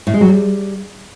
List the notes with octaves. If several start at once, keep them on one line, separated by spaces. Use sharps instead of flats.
A2
G#3
F#3
G3